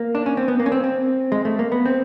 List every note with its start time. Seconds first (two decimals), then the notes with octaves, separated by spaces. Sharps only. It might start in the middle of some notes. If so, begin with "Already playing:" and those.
Already playing: A#3
0.15 D4
0.26 C#4
0.37 C4
0.48 B3
0.59 A#3
0.66 C#4
0.72 C4
0.84 C4
1.32 G#3
1.45 A3
1.59 A#3
1.72 B3
1.86 C4